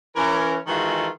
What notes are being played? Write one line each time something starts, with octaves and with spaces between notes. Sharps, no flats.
E3 C#4 A#4
D#3 E3 G#3 F4 F#4 A4